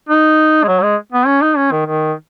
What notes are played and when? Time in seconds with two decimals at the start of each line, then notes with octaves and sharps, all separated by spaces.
0.09 D#4
0.63 G#3
0.68 F#3
0.83 G#3
1.12 B3
1.27 C#4
1.42 D#4
1.57 C#4
1.72 D#3
1.86 D#3